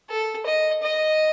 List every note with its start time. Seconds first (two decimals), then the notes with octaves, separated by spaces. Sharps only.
0.10 A4
0.46 D#5
0.83 D#5